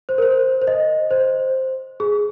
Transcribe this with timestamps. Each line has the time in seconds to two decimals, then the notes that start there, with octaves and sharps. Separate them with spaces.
0.09 C5
0.18 A#4
0.22 C5
0.62 C5
0.67 D#5
1.11 C5
2.00 G#4